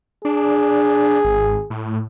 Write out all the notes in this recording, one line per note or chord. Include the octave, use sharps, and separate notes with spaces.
D4 G#4
G#1
A2